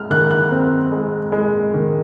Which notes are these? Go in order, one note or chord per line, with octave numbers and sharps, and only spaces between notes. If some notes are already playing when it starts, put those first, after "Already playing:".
Already playing: G#3 F6
D#3 F#6
F#6
C4
G#3
G#3
D#3